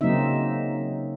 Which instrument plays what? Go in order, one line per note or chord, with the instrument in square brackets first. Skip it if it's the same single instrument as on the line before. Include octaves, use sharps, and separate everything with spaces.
[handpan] C#3 F#3 A#3 C4 D#4 E5